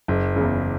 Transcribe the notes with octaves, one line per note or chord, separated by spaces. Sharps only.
F#1
E2 C#3